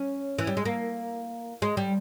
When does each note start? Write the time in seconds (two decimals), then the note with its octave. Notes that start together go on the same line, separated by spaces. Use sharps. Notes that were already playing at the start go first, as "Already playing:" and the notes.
Already playing: C#4
0.39 E3
0.47 G3
0.57 G#3
0.65 A#3
1.62 G#3
1.77 G3